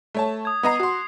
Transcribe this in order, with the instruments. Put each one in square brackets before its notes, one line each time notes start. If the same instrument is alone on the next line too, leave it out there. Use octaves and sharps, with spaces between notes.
[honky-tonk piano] A3 C#5 A5
[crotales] D#6 G#6
[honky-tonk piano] B3 D#5 A#5 [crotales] D#6 C7
[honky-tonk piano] F#4 C6